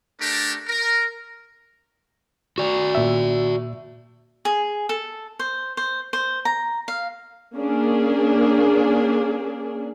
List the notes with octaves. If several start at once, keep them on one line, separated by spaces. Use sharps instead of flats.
A3 D4 G4 A#4
A#4
F#4 D5
A#2 E5
G#4
A4
C5
C5
C5
A#5
F5
A#3 C#4 D4 G#4